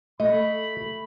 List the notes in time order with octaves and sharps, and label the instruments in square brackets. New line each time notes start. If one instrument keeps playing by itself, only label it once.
[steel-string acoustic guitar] A3 [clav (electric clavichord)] D#5 [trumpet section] B5